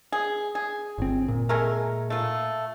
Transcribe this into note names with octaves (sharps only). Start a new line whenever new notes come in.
G#4
G#4
G1 C4
A#2
G#3 A3 A#4
A3 F4